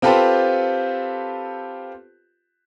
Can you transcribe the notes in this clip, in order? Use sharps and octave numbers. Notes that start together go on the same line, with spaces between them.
C4 F4 G4 A4 B4 C5